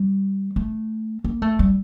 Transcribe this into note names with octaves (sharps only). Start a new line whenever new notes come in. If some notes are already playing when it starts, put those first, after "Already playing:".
Already playing: G3
A3
A#3
A3
G3